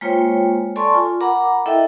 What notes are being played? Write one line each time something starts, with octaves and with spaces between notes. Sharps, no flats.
G#3 A#3 F4 C5 C#5 G5
A4 D5 G#5 A5 C6 C#6
F4
A#4 F#5 A#5 B5 D6
E4 A4 D#5 E5 G5